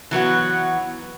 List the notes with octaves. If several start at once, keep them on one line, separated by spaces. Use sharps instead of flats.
E3 F#3 B3 F#4